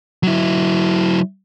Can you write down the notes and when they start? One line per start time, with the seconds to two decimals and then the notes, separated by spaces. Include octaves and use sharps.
0.23 F#3 E4